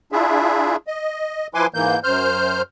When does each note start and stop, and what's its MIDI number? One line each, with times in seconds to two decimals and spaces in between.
0.12 0.76 62
0.12 0.76 64
0.12 0.76 65
0.12 0.76 68
0.12 0.76 76
0.87 1.47 75
1.54 1.67 53
1.54 1.67 64
1.54 1.67 71
1.54 1.67 80
1.54 1.67 84
1.54 1.67 86
1.74 2.00 44
1.74 2.00 52
1.74 2.00 58
1.74 2.00 91
2.04 2.62 42
2.04 2.62 72
2.04 2.62 89
2.04 2.62 91